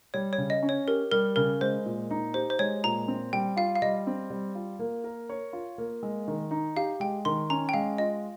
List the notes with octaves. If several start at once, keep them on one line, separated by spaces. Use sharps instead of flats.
G3 C#5
C#5
C#3
D#5
C#4
C#5
G4 A#4
G3 A#4
C#3 A#4
G#3 C5
A#2
D#4
G4 C5
C5
G#3 C#5
A#2 A#5
C4
G3 G5
F4 F5
F5
G3 D#5
C4
G3
F4
A#3
A#4
C#5
F4
A#3
G#3
D#3
D#4
G4 F5
G#3 G5
D#3 C6
C#4 A#5
G5
G#3 F5
F4 D#5